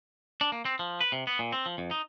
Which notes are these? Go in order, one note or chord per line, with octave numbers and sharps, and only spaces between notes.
D4
A#3
C4
F3
B4
C3
B3
A#2
C4
F3
F2
D#4